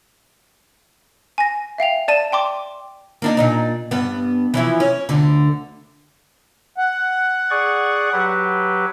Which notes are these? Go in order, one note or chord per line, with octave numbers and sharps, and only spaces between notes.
G#5 A#6
E5 F5 G5 F7
D5 A5 D#7 E7
G5 C6 D6
A#3 D4 D#4
A#2 D4 D#4
G2 B3
E3 F3 E4
C#4
D2 D3
F#5
G#4 D5 C#6
F#3 G4 B4